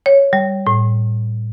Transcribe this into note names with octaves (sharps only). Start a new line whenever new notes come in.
C#5
G3
A2